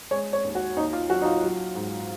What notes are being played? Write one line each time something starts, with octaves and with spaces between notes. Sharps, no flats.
G#3 C#5
C#5
D#2
F#4
D#2 D#4
F4
F#3 F#4
D#4
F4
F#3
G#2